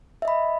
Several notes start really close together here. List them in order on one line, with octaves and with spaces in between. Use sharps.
E5 D#5 B5